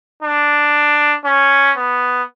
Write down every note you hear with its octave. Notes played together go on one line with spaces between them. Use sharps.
D4
C#4
B3